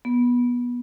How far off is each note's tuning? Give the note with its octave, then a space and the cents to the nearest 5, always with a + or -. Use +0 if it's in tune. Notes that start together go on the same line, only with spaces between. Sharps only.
B3 -20